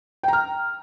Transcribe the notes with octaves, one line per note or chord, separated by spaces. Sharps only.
G5 A#5 F6